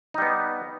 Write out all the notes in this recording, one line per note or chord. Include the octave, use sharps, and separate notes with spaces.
G3 B3 D#4